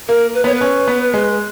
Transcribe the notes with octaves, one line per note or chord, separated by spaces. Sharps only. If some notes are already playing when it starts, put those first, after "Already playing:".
A#3 A#4
B4
B3 C#5
B4
C#4
B3
G#3